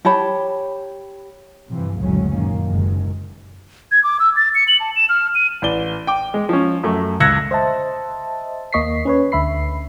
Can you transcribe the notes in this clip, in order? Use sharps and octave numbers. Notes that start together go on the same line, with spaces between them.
G4 C#5 A5 B5
G2 C3 E3 F3
F#1 D2 A#2 F#3 G#3 C#4
F#2 A#2 D#3 A#3
F#1 D#2 D#3 G#3
G#6
D6
E6
A6
C#7
F#7
A5
E7
F6
D#7
A1 D5 G7
G5 D6
G#3
F3 C#4
F#2 A3
C#2 E6 F#6 G#6 A#6 C#7
C5 D#5 E5 A5
D#2 A#3 D#5 C#6 B6 C7
C#4 B4 C#5
D2 D3 E5 B5 C7